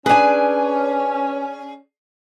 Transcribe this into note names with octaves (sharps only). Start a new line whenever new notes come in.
C#4 D4 G#4 B4 G#5